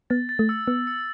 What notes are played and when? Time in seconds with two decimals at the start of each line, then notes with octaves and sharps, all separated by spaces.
0.10 B3 A6
0.29 A6
0.39 A3
0.49 E6
0.67 B3 E6
0.87 E6